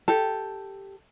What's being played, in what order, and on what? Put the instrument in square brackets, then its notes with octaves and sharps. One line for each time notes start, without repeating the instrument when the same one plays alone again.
[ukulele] G4 A4